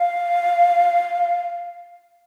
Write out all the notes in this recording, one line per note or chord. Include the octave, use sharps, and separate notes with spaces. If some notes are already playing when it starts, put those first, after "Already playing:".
Already playing: F5